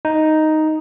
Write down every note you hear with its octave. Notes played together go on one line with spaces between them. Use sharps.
D#4